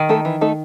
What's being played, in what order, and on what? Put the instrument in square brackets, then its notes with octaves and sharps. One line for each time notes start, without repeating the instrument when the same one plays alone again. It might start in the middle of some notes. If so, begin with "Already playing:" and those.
Already playing: [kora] D#3
[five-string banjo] A3 D#4 A4
E3
A3 D#4 A4